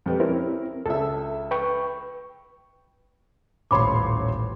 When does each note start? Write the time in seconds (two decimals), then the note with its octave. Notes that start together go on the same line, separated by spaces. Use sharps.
0.06 F2 G4 B4
0.20 C4 C#4 E4 A#4
0.86 C#2 G#4 A4 E5
1.51 B4 G5 C#6
3.71 D#1 A1 C#5 B5 C6 D6